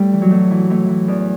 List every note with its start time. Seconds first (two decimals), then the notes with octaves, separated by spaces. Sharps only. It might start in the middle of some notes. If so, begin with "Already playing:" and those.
Already playing: A2 G3
0.13 E3
0.22 F#3
0.31 A2
0.50 E3
0.70 A2
0.88 E3
1.08 E2